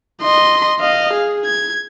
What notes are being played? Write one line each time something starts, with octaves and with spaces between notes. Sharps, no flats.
D#5 C6
D#5 F5
G#4
G#6